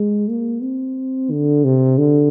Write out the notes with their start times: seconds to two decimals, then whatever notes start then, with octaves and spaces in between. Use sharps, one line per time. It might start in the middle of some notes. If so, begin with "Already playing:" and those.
Already playing: G#3
0.29 A#3
0.63 C4
1.31 D3
1.65 C3
1.98 D3